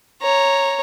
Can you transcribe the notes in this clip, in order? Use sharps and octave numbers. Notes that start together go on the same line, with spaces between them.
C#5 A#5